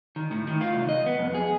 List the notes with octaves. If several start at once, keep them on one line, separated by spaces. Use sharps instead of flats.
D#3
A2
D#3
F4
C2
D#5
B3
F2
G#4